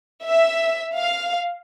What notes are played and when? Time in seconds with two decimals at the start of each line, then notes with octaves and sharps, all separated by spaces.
0.25 E5
0.96 F5